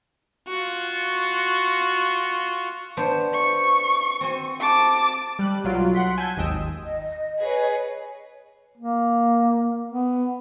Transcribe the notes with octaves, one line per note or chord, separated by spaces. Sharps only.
F4 F#4
B3 D4 C5
C#6
C4 F#4 G#5
A5 D6
G3 F#6
B1 F#3 F4 D7
F#5 C6 B6
G#5 A5 E6 F#6 G6
G#1 D#2 D#5 G5 D#6 E6
D#5
G#4 B4 C#5
A#3
B3